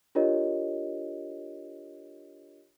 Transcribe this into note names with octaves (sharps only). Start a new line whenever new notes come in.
D4 F4 G4 A#4 C#5 D#5